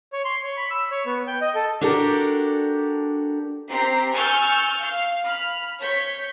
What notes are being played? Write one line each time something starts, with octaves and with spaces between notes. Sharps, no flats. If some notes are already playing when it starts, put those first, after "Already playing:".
C#5
C6
C#5
B5
E6
C#5
B3
G5
D#5
A4
D4 F#4 G4 A4 A#4
C4 G4 A#5 C7
G#5 C#6 E6 F6 G6 A6
F5
B5 F6
C#5 G6 B6